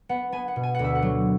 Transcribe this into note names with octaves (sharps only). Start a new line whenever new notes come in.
B3 F#5
B3 G#5
F#5
B2
G#5
D2 F#5
E5
F#5
F#3